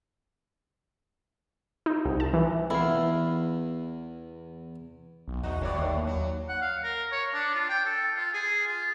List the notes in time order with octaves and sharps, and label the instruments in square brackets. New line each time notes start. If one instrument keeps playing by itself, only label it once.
[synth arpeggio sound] D#4
C2
A5
E3
[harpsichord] E2 [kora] E4 F5
[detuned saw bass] B1
[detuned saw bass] E2 [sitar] D#4 F#4
[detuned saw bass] G1 [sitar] A2 C#5 D5
[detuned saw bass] D#2
[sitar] F#3
[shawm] F#5
F5
A#4
C#5
D4
F4
G5
A4
F4
G#4
F4